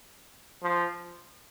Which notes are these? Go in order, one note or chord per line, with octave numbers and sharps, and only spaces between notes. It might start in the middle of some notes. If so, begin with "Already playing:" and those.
F3